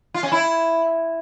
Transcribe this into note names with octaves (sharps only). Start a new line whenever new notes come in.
F4
C#4
E4